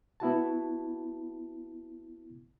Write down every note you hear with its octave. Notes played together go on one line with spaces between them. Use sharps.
B3 E4 F#4 A5